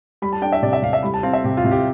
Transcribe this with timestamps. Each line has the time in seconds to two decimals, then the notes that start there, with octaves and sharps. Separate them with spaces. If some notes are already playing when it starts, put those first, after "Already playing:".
0.22 G3 B5
0.32 A5
0.42 D4 G5
0.52 E5
0.62 C3 D5
0.73 E5
0.82 C3 F5
0.93 E5
1.03 G3 B5
1.14 A5
1.23 C4 F5
1.33 E5
1.44 C3 G4
1.57 F4
1.65 C3
1.71 G4